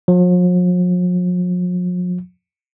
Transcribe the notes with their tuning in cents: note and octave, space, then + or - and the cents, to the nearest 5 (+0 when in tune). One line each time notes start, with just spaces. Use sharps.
F3 +45